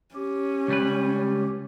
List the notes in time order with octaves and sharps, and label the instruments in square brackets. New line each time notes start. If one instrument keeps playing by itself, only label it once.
[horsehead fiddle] C#4 [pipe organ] G4
[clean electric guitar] C#2 G3 B4